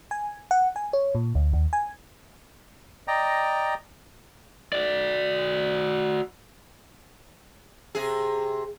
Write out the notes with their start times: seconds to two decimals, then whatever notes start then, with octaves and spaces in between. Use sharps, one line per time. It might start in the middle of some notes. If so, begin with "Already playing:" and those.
0.11 G#5
0.51 F#5
0.76 G#5
0.93 C#5
1.15 A#2
1.35 D2
1.53 D#2
1.73 G#5
3.08 D5 D#5 G5 A#5
4.73 F#4 D5
7.95 C3 G#4